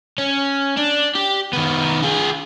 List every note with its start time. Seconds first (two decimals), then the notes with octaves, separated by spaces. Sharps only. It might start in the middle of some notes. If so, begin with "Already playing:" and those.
0.18 C#4
0.77 D4
1.15 G4
1.53 D#3 B3
2.03 F4 G#4